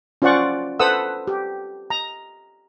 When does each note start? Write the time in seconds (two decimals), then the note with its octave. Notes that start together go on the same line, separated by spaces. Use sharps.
0.22 C#4 F4 C5 D5 F#5 C#6
0.79 A4 B4 C5 F#5 D#6 E6
1.27 G4
1.90 A#5